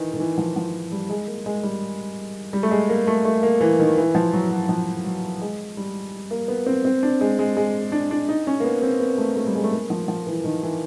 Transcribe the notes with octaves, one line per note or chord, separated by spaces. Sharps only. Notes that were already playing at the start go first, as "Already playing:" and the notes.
Already playing: D#3 E3
D#3
E3
F3
F3
G3
G#3
A#3
G#3
G3
G3
A3
G#3
A#3
A3
A3
A#3
E3
D#3
E3
F3
F#3
F#3
F3
F#3
G#3
G3
A#3
B3
C4
C4
D4
G#3
G#3
G#3
D4
D4
D#4
C#4
A#3
B3
C4
B3
A3
A3
G3
G#3
A3
A#3
F3
F3
E3
D#3
E3